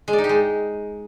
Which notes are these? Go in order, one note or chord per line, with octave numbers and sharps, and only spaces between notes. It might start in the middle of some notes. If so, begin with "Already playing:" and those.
G#3
D5
D#4
G4
G#3